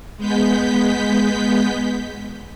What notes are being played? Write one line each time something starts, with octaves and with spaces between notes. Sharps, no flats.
G#3 B3 G6 B6